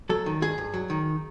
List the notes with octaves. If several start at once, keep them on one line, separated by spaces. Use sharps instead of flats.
F#3 A4
D#3
G2 G#4
G2
F#3
D#3